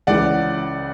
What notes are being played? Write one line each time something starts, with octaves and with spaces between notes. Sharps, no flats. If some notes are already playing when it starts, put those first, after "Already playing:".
C#2 C#3 E3 D5 F#5